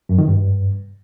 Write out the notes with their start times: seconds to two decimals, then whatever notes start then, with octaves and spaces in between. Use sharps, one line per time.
0.09 F#2
0.19 D#3
0.28 G2